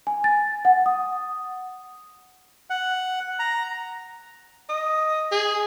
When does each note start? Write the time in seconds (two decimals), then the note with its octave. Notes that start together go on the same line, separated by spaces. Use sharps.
0.07 G#5
0.24 A6
0.65 F#5
0.86 D#6
2.70 F#5
3.39 A#5
4.69 D#5
5.31 G#4